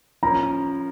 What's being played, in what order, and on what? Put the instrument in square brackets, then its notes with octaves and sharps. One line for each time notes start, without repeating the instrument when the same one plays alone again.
[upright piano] F3 A#3 C#4 [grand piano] A#5